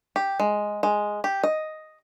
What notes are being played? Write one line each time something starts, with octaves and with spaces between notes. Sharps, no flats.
G4
G#3
G#3
G4
D#5